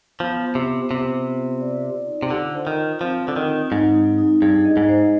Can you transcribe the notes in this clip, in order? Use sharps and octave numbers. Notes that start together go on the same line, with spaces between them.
F3 B3
F4
C3
F4
C3 B3
B3
F4
D5
D5
D#4
C3
D3 F4
C5
D#3
F4
F3 C4
D3 C4
D#3
C4
G#2 D#4
D#4
D#4
G2 G#4
D#5
G#2
C5